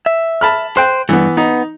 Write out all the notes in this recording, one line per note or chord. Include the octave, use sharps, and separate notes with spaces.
E5
A5 B5 F6
C5 G5 F#6
G2 E3 B3
B3 D#4